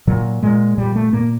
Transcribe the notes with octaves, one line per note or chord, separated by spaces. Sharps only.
A#2 F#3
A#2 G#3
A#2 G3
A3
A#2 A#3